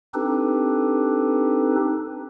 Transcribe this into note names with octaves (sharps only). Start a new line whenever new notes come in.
C4 D4 D#4 G4 A4 B4